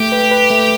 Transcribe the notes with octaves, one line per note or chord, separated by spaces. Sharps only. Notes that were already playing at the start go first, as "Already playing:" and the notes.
Already playing: A3 G4
B4
B4
A3